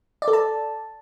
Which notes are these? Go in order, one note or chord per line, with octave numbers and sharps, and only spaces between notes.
D5
A4
A5